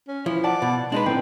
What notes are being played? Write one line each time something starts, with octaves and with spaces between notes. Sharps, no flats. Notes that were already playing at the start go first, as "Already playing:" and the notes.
C#4
E3 F3 E4
D5 F#5 A5 A6
B2
G#3 D4 D#4 B4
A2 C4